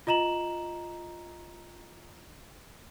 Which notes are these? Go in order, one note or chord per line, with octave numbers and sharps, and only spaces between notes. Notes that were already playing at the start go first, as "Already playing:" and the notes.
F4 D#5 A#5 E7 F#7